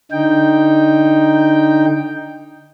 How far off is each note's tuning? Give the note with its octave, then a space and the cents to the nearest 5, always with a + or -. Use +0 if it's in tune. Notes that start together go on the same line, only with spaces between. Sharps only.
D3 +0 D#4 +0 G5 +0